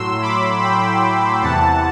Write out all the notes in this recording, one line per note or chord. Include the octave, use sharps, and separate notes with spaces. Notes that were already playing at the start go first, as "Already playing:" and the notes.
Already playing: A2 F#3 C6 E6
B5 D6
G5 B5
E2 C3 E3 F#5 A5